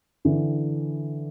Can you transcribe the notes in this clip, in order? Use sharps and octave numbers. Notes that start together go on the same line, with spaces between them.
D3 E3